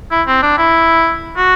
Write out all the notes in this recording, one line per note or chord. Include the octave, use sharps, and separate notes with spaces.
E4
C4
D4
E4
F#4